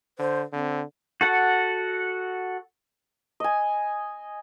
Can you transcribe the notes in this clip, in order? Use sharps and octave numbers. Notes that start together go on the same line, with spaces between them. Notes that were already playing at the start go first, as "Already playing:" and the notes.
D3 C5
D3 C4
F#4 A4 F#5
D#5 G#5